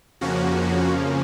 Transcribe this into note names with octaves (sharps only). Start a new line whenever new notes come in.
F2 C#3 F3 A#3 C#4 F#4